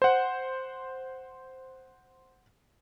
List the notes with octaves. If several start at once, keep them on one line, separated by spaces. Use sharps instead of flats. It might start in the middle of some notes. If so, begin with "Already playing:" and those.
C5 F#5